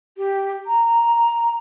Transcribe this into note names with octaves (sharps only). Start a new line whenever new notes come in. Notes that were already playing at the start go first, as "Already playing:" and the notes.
G4
A#5